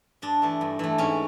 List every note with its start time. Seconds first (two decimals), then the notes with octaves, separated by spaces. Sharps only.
0.22 G2 D4
0.42 E3 A3
0.61 G2
0.79 E3 A3
0.98 G#2 C#4